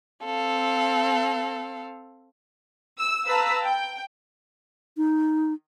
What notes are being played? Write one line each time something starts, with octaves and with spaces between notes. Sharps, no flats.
C4 A4 F5
E6
B4 F5 A5 A#5 E6 B6
G5
D#4